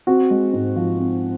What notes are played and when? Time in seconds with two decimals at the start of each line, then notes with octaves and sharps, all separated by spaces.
0.07 C4 F#4
0.30 G#3
0.53 G#2
0.76 F3
0.99 C4